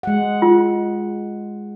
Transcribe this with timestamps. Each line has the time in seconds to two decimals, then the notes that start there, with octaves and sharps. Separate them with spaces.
0.03 G#3 F#5
0.42 F4